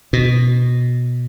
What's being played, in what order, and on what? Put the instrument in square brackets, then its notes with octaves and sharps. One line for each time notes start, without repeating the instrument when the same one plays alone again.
[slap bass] B2